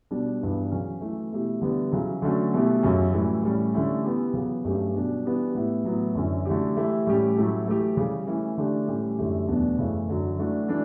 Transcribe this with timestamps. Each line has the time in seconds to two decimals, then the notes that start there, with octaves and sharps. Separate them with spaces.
0.11 B2 G3 D4
0.41 G2 E3 B3 D4
0.71 C#3 F#3 C#4
1.01 E3 A3 E4
1.32 B2 A3 E4 G4
1.61 D3 G3 B3 E4 G4
1.92 C#3 F#3 C#4 E4
2.22 D3 F#3 A3 C#4 F#4
2.53 B2 A3 E4 G4
2.83 F#2 C#3 F#3 C#4
3.13 A2 E3 G3
3.43 A2 G3 C#4
3.74 D3 A3 C#4 E4 G4
4.04 E3 B3 E4 G4
4.33 C#3 F#3 B3
4.64 G2 F#3 A3 C#4 G4
4.94 B2 G3 D4 G4
5.25 E3 B3 D4 G4
5.55 A2 E3 B3 E4 G4
5.85 A2 F#3 B3 E4
6.15 F#2 D3 F#3 C#4 E4
6.45 D3 A3 E4 G4
6.76 E3 A3 E4 G4
7.07 A2 G3 C#4 G4
7.37 A2 F#3 A3 E4
7.66 E3 A3 E4 G4
7.97 C#3 E3 G3
8.27 E3 A3 C#4 E4
8.57 D3 A3 D4 G4
8.88 A2 E3 G3 C#4 G4
9.18 F#2 D3 A3 E4 G4
9.48 E2 B2 F#3 A3 D4
9.78 F#2 C#3 E3 A3
10.08 F#2 D3 F#3
10.38 E3 A3 D4 F#4
10.68 E3 A3 D4